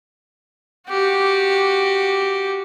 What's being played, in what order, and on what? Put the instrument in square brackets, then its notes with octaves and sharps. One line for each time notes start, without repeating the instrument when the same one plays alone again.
[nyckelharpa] F#4 G4